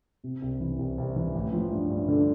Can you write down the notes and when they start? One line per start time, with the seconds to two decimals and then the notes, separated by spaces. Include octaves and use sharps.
0.24 C3
0.42 C2
0.60 E3
0.79 C2
0.98 C2
1.16 E3
1.35 A1
1.52 F3
1.71 G2
1.90 G2
2.08 D3